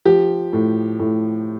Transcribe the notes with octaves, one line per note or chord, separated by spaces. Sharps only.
F3 G4
A2
A2